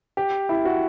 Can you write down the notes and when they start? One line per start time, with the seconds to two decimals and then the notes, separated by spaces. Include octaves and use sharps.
0.17 G4
0.49 E4
0.65 F#4